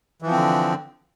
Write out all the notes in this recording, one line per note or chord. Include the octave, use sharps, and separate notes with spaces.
D3 E3 F3 C4